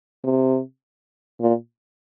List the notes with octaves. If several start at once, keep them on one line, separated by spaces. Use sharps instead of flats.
C3
A#2